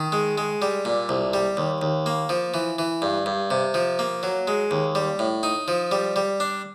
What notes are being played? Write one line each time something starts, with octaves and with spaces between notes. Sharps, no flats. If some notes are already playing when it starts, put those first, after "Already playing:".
Already playing: D#3
G#3
G#3
G3
A#2
C2
G3
D#2
D#2
A#3
F3
E3
E3
G2
G2
C3
F3
A#3
F#3
G#3
D#2
G3
A2
D#4
F3
G3
G3
D4